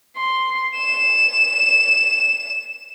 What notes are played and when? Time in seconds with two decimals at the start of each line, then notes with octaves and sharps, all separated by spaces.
0.17 C6
0.77 E7